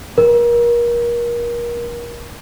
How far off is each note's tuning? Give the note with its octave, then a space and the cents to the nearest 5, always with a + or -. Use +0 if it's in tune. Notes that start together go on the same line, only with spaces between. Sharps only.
A#4 +30